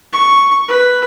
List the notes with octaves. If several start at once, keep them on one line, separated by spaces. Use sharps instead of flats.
C#6
B4